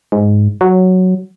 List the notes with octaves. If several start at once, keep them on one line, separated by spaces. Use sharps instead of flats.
G#2
F#3